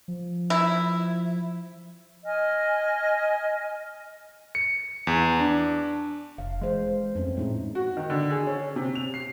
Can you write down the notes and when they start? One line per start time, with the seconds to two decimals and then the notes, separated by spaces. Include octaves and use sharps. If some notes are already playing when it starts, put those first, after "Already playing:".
0.08 F3
0.50 E4
2.25 D#5 G#5 F6
4.55 C#7
5.07 E2
5.40 D4
6.38 F1 F5
6.61 E3 G#3 C5
7.15 F2 A3 C4 C#4
7.37 A2 G#3 D#4 E4
7.75 F#4
7.97 D#3
8.10 D3
8.30 G#4
8.47 C#4
8.76 C3
8.95 F7
9.14 C7